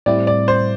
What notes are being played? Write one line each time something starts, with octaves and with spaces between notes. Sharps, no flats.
A2 G3 C4 E4 D5
D5
C5